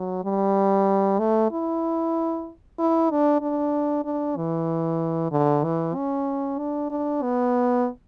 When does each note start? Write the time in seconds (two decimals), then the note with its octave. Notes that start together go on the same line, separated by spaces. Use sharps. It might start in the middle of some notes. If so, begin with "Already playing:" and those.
Already playing: F#3
0.24 G3
1.19 A3
1.52 E4
2.79 E4
3.11 D4
3.41 D4
4.05 D4
4.37 E3
5.31 D3
5.64 E3
5.96 C#4
6.58 D4
6.91 D4
7.23 B3